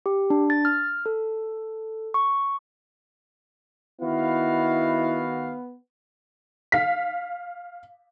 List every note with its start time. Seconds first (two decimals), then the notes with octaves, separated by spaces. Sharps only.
0.06 G4
0.30 D4
0.50 A6
0.65 F6
1.06 A4
2.14 C#6
4.01 D#3 B3 E4 F#4 F5
6.72 F5 B6